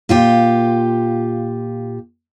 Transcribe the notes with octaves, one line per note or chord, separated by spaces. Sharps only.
A#2 F4 G4